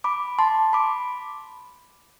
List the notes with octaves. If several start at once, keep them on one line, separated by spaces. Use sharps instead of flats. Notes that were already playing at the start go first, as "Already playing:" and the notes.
B5 D6
A5 C6
B5 D6